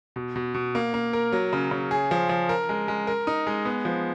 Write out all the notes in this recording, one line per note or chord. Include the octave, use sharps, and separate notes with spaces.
B2
B2
B2
A#3
A#3
A#4
F#3
C#3
C#3
G#4
F3
F3
A#4
G#3
G#3
A#4
D#4
G#3
B3
F3